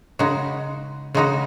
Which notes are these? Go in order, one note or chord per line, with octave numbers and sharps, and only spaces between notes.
C#3 G#3 D#4 F#4
C#3 G#3 D#4 F#4